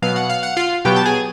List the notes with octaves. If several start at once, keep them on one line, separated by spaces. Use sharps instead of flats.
B2 F#3 B3 F5
F#5
F5
F#5
F4 F5
B2 F#3 B3 G4 G5
A5
G#4 G#5